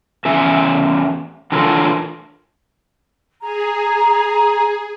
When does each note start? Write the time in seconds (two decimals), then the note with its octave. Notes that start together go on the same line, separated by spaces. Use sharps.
0.25 E2 E3 C#4 E5
1.52 E3 D4 F4 A4 A#4 C#5
3.41 G#4 A#5